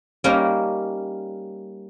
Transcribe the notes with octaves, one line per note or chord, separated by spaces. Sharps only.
G3 A#3 C#4 D#4 A#4